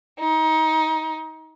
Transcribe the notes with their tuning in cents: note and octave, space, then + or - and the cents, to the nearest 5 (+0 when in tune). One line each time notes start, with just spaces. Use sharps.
D#4 +25